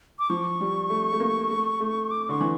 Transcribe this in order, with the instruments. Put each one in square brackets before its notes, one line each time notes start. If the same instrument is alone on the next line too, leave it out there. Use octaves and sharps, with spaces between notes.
[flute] D6
[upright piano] F3 [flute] C#6
[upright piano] G3
A3
A3
A#3
A3
A3
[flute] D6
[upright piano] D3 [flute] C#6
[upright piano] E3